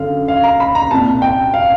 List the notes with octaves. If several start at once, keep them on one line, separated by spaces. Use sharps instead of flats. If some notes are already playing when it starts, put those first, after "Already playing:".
Already playing: F#2 D3 F5
F5
A#5
B5
A#5
C2 A#2 A5
G5
F5